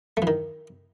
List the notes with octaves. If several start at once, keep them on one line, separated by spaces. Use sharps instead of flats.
A3
E3
D#3